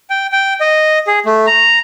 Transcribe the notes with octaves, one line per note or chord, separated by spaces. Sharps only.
G5
G5
D#5
G#4
A3
A#5